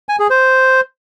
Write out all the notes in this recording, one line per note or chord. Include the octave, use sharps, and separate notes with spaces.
G#5
G#4
C5